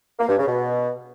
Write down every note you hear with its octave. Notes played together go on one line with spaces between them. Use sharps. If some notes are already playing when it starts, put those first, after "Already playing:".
A#3
G2
C#3
B2